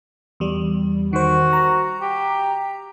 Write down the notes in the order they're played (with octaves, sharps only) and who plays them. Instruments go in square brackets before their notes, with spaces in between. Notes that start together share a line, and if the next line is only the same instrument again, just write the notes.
[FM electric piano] E2 G3
[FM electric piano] D#3 C5 [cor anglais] F#4
[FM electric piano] A#5
[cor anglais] G4